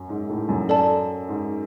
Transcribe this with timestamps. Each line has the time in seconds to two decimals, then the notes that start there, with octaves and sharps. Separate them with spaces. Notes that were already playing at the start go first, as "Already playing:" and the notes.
Already playing: F#2
0.09 G#2
0.29 A2
0.49 F#2
0.69 A4 D5 A5
1.28 G#2